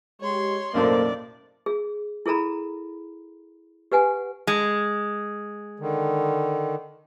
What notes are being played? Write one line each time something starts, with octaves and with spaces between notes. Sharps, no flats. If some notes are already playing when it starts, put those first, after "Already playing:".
G#3 G4 C#5 C6
B1 F#2 A2 A#3 A4 A#4 C5 D5
G#4
E4 G#4 A4 A#5 B5
G4 B4 F#5 G#5
G#3
D3 D#3